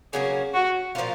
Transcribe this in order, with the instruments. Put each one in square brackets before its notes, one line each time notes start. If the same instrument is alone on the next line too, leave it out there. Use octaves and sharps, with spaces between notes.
[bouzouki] C#3 F#3 A#3 C#4 [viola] G#4
[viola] F#4
[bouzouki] A#2 F3 A#3 F4